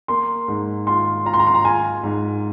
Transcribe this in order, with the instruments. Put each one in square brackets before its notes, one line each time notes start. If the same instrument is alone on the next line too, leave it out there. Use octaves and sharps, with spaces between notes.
[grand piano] A#3 [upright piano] C6
[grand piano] G#2
[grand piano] F4 [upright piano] C6
[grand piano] F4 [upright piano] A#5
[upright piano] C6
A#5
C6
A#5
[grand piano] F4 [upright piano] G#5
[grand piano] G#2